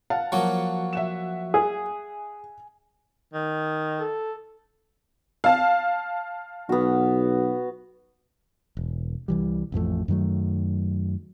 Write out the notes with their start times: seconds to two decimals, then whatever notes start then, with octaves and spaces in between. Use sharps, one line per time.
0.10 F5 F#5 A5
0.32 F3 F#3 A#3 F#4 C#6
0.93 E5 F#5 E7
1.54 G#4 G#5
3.34 D#3
4.00 A4
5.44 F5 A5
6.69 B1 B3 F#4
8.77 E1
9.28 C2 E3 G3
9.72 A1 F2 F3 A3
10.08 F#2 D#3 F#3 A3